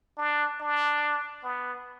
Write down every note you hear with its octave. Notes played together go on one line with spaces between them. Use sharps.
D4
D4
B3